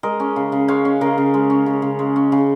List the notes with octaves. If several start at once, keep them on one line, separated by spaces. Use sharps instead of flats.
G#3 A#4 D#5
C#4
C#3
C#3
G#3 C#5 F5
C#4
C#3 A#4 D#5
C#3
G#3
C#4
C#3
C#3
G#3
C#4
C#3